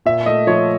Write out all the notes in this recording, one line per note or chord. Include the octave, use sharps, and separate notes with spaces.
A#2 E5
A3 D#5
F3 C#5